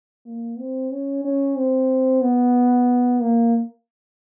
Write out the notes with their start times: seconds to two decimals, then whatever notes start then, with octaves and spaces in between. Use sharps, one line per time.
0.26 A#3
0.59 C4
0.91 C#4
1.24 C#4
1.56 C4
2.21 B3
3.21 A#3